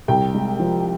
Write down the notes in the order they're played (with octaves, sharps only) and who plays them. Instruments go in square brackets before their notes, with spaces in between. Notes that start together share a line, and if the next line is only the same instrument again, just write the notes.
[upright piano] C2 G5
G#3
F3